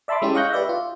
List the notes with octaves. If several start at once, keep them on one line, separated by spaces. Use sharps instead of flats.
D5 E5 A5 B5 C6 D6
G#3 C#4 E4 G4
D#5 F5 C#6 F#6 G6 A#6
G4 B4 D5 E5
F4